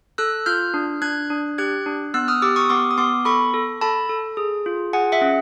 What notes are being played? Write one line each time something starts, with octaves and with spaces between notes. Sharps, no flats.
A4 E6 F#6
F4 F6 G6
D4
D4 F#6 G#6
D4
G4 F#6 G#6
D4
B3 E6 F#6
D#6 F6
G4 D6 E6
C#6 D#6
B3 C6 D6
D#6
B3 C6 D6
A4 B5 C#6
A4
A4 A5 B5
A4
G#4
F4
G#4 F#5 G#5
E5 F#5
C#4